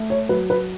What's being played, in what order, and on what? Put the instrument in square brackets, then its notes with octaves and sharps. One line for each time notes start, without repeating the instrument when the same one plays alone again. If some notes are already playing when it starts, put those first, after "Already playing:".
Already playing: [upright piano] A3
C#5
F#3 B4
B4